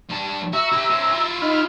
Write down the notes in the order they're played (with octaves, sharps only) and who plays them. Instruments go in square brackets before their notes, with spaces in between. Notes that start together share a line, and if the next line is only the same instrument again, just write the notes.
[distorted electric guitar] G2 A5
[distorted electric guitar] F#4 [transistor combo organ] E5 A#5
[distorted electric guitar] E4 G4
C#4 C5
E4 F4
[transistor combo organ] D#4 B5 F6